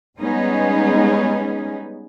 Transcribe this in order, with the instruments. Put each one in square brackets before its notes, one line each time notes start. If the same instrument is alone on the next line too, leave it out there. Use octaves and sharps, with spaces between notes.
[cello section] G3 G#3 B3 C#4 D#4 G#4